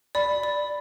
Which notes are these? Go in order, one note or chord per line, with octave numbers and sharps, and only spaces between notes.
D5 B5
D5